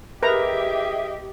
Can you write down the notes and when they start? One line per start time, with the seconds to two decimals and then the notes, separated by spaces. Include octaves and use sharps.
0.23 E4 G4 G#4 A#4 B4 D#5 E5 A#5